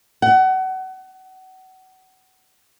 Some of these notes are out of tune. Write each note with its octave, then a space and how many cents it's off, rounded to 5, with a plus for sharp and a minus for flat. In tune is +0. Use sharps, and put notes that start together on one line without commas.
F#5 +30